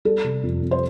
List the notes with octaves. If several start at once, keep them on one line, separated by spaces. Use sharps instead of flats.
G3 A4
C3
F2
F2
C5